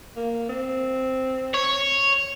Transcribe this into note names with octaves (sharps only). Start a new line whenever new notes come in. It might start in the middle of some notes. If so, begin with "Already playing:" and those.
A#3
C4
C#5